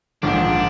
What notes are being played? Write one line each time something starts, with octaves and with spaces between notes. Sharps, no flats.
A#1 G#2 F3 D4